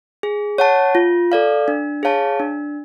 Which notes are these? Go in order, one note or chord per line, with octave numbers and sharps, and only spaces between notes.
G#4
C#5 F#5 A5
F4
A4 D5 F5
D4
G#4 C#5 F5 A5
D4